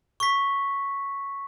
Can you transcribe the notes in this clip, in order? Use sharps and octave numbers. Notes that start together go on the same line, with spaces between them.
C#6 B6